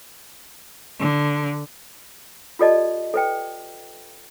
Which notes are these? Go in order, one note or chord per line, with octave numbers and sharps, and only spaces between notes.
D3
F4 G4 A4 D5 D#5 A5
A4 B4 G5